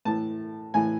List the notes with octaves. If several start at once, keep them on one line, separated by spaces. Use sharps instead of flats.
A2 E3 A5
A2 E3 G#5